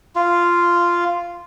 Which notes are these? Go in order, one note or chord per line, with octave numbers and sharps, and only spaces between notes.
F4